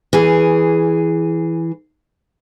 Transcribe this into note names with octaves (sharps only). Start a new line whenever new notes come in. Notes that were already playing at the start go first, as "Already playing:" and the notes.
E3 G#4